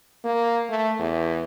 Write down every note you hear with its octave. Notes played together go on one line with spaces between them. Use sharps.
A#3
A3
E2